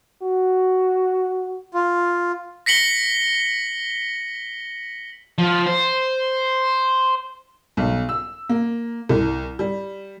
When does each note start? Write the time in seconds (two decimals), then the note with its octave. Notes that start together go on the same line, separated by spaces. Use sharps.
0.22 F#4
1.74 F4
2.66 A#6 B6 C#7 F#7 G7
5.38 F3
5.66 C5
7.77 B1
8.09 E6
8.49 A#3
9.09 C2
9.59 G3